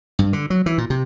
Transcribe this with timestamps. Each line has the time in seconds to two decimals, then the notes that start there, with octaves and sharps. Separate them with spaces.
0.19 G2
0.33 D3
0.50 F#3
0.66 E3
0.78 A#2
0.90 C3